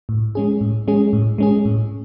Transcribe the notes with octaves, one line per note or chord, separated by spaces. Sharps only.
A2
G#3 C#4 G#4
A2
G#3 C#4 G#4
A2
G#3 C#4 G#4
A2